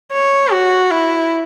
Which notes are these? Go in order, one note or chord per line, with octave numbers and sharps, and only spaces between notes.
C#5
F#4
E4